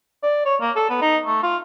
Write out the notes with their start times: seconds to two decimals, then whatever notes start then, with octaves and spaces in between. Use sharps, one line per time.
0.23 D5
0.45 C#5
0.61 A#3
0.76 A4
0.90 B3
1.02 D#4
1.25 A3
1.43 F4